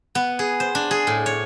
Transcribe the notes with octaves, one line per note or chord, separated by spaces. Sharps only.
B3
G#4
C5
D4
G#4
A2
C#5